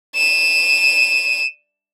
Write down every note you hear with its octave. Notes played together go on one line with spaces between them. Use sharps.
D#7 E7